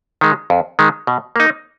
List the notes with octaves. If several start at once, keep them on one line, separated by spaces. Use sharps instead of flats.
D#3 G#3
F2
D#3 G#3
B2
A#3 D#4